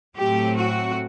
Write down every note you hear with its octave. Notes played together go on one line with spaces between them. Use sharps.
A2 F#3 A3 C4 G4
F#4